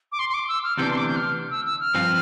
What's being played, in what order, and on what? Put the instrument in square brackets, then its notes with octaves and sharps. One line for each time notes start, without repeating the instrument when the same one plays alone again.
[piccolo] D6
C6
C6
D6
E6
F6
[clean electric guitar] D2 C3 E3 B3 D4 [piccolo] G6
[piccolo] C6
D6
G6
F6
E6
E6
F6
[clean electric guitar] G2 F3 C4 F4